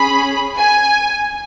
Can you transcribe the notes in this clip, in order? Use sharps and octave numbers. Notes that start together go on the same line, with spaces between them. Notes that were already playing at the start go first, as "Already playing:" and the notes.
Already playing: C#4 G#4 B5
G#5